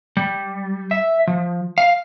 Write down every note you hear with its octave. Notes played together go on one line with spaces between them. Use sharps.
G3
E5
F3
F5